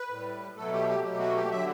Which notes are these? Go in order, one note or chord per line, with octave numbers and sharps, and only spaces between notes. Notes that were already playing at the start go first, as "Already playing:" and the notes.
Already playing: B4
A2 G3
B2 F#3 A3 A4
G4
G4
B2 F#3 A3 G4
F#4
G4
D3 F#3 E5